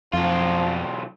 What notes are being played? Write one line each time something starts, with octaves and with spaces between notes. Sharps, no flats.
B1 F2 F3 F4